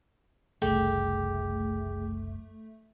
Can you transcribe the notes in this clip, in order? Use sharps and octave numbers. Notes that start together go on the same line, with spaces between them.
F#1 C2 F#2 A3 G4 G#4